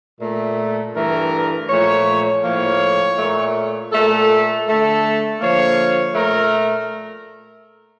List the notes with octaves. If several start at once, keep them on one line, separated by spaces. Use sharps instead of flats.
A#2 A3
G2 E3 A3 A#4
A#2 F3 A3 C#5
A2 F3 A#3 C#5
A#2 A3
A#2 A3 A4
D3 A3 A4
D3 F3 A#3 C#5
A#2 A3 A#4